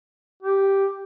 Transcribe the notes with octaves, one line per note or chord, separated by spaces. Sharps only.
G4